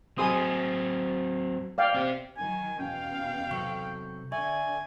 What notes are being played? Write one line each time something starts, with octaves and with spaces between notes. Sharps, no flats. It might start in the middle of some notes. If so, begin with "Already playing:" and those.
F#3 C4 G#4 C6 D#6
D5 F5 G5
C4 G4
D#3 F#3 G#5
E2 B2 C#4 F5 G5
C3 F#3 A4 C#6 G6
D3 D4 D5 E5 G#5 C#6